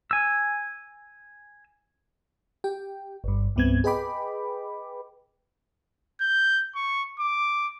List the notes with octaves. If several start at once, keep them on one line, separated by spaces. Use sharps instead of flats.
G#5 E6
G4 G5
G1 G2
C2 G2 B3 C4 G#6
G#4 B4 D#5 G5 B5 D6
G6
C#6
D6